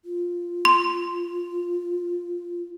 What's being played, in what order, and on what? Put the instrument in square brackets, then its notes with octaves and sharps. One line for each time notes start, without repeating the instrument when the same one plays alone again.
[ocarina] F4
[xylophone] C6